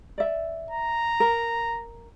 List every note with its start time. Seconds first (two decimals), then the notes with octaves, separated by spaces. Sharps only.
0.18 D5 E5
0.71 A#5
1.20 A#4